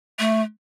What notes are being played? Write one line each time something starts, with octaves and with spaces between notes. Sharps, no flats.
A3